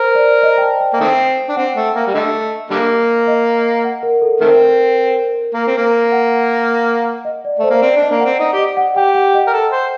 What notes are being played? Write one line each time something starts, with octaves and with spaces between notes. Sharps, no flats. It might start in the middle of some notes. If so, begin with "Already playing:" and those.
Already playing: A#4 C5
D5
D#5
G5
A5
G5
A#3
D#3 A3 C4 G5
D4
C4 F#5
A3
A#3
G3
D3 A3 D#5
D3 G3 A#3
D#5
F#5
A#4
A4
D#3 A3 C4 A#4
A#3
C4
A#3
F#5
D#5
D5
A3 C5
A#3
C4 D5
D4
D#5
A#3
F#5
C4
D#4
G4
D#5
F#5
G4 G5
F#5
D#5
A#4
A4
C5